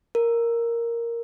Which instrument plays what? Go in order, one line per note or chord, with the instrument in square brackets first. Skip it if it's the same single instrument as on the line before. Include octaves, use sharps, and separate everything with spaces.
[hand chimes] A#4